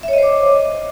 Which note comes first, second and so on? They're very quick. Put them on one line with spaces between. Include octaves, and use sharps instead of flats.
E5 C#5 D#5 C5 D6